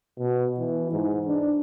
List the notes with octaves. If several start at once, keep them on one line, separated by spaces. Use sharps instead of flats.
B2
E3
G#2
D4